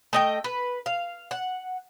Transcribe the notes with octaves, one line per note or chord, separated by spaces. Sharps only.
A3 D#5 G5
B4
F5
F#5